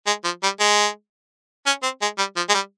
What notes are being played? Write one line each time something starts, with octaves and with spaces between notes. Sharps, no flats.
G#3
F3
G3
G#3
C#4
C4
G#3
G3
F3
G#3
G3